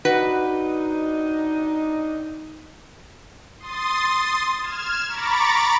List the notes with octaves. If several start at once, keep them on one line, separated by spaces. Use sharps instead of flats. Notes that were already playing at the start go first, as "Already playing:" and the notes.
C4 D4 D#4 F#4 B4
C6 D#6 A6
F6 G#6 E7
A#5 B5 C#6 D6 A6